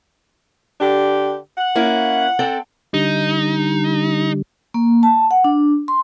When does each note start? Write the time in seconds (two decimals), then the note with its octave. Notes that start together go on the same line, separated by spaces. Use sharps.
0.81 D3 D4 G4
1.58 F#5
1.75 A#3 C#4 E4
2.39 C4 A4 D5
2.94 D3 G3 D#4
4.74 A#3
5.03 A5
5.31 F#5
5.44 D4
5.88 C6